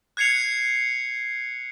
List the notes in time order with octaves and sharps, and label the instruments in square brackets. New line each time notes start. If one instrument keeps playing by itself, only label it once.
[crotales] F#6 G#6 C7 C#7 F7